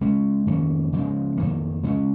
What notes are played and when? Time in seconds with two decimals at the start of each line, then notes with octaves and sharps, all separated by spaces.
0.01 C#3 G#3 C#4
0.47 F2 D#3 A#3 C#4
0.93 C#3 F3 G#3
1.37 F2 D#3 A#3
1.83 C#3 G#3 C#4